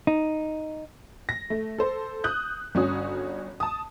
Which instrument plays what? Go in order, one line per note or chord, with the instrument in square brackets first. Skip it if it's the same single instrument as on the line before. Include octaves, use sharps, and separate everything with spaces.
[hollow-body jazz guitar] D#4
[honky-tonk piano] A#6
A3
A4 C5
D#6 F#6 G6
G1 C#4 F#4 D#6
A5 D#6